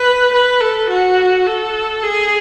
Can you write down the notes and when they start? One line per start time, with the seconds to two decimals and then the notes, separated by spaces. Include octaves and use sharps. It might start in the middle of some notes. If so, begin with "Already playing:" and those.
Already playing: B4
0.33 B4
0.61 A4
0.90 F#4
1.47 A4
2.03 G#4